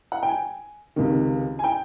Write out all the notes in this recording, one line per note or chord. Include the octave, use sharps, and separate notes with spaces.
F#5
G5
G#5
C#2 C3 D#3
G#5
G5